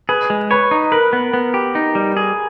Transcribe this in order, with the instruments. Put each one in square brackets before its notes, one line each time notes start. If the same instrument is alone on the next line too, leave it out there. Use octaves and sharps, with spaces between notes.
[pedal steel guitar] G#4 [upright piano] B4
[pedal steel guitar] G#3
[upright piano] B4 [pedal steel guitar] C#5
[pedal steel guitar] D#4
[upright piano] A#4 [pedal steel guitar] B4
[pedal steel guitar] B3
B3
G4
D#4
G3
G#4